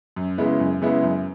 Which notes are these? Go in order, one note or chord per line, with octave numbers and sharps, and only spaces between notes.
F#2
C#3 G#3 B3 E4
F#2
C#3 G#3 B3 E4
F#2